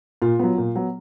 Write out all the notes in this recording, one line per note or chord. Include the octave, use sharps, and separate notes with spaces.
A#2 F4
F#3 B3
A#2
F#3 B3